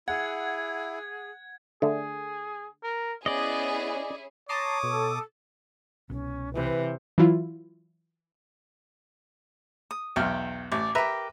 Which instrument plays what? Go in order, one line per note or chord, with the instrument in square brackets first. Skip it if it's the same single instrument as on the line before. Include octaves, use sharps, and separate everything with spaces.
[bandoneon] E4 [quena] G#4 [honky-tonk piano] F#5 [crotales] G#6
[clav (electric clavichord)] D3 A3 [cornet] G#4
[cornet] A#4
[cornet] B3 [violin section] C#4 E4 G#4 [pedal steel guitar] D5 D#5
[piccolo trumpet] C#5 [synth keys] A5 A#5 C6 [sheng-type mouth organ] D6 D#6
[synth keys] B2 [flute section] A4
[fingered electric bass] C2 B2 [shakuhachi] C#4
[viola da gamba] C3 [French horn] E3 [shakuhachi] B4
[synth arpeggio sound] E3 F#3 E4 F4
[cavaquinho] D#6
[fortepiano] B1 E2 F6 [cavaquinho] G5
[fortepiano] A1 [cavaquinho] D5
[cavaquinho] G4 A#4 [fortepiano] B4 E5